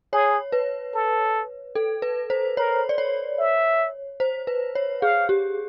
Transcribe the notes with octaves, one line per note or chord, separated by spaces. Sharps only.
G#4 C#5
B4
A4
A4
B4
C5
A#4 C#5
D5
C#5
E5
C5
B4
C#5
G#4 F5
G4